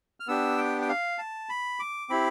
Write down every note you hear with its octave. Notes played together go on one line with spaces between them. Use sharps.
F6
B3 D4 G4 E6
G5
G5
F5
A5
B5
D6
C4 E4 G4 B5